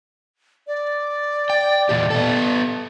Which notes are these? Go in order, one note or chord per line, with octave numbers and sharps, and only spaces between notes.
D5
G5
E2 A#2 G4
B3 A4